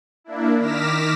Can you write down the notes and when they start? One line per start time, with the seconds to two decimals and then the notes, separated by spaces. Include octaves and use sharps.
0.24 A#3 D4 E4
0.59 D#3 D6 F6 A#6 B6 E7